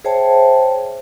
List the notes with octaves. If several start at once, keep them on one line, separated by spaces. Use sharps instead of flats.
G#4 C5 C#5 E5 G5 A5